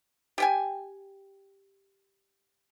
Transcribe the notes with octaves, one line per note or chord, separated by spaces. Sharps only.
G4 G5 G#5